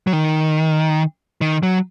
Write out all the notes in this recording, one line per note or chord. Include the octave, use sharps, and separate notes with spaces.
F#3
D#3
D#3
F#3